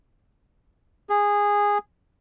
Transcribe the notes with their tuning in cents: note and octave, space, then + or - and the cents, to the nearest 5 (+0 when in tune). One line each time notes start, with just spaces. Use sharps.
G#4 -15